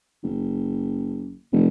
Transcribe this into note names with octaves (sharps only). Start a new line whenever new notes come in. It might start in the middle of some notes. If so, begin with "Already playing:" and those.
F#1
F1